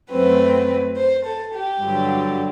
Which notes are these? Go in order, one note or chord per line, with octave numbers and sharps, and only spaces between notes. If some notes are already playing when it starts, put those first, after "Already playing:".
F#2 F#3 A3 C4 B4
C5
A4
G4
G2 D3 F#3